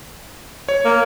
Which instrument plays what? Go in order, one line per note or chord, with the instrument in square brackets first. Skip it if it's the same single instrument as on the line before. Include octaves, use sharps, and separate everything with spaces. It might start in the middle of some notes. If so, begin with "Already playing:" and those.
[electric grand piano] C#5
[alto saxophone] A#3